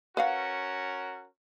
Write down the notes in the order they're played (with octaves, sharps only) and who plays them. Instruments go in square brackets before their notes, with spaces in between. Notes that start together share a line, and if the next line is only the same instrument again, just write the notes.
[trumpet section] C#4 F#4 A#4 [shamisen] B4 F5 F#5